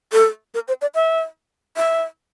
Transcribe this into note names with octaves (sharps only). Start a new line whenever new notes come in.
A4
A#4
C5
D5
E5
E5